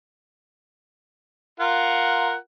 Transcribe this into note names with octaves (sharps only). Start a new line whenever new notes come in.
F4 A#4 F#5